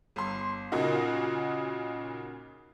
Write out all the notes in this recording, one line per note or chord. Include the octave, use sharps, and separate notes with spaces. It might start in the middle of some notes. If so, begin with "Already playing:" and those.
G1 C6
A#2 C#3 A#3 D#4 F#4